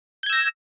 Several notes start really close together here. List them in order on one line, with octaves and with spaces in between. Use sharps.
G6 G#6 E6 A#6 E7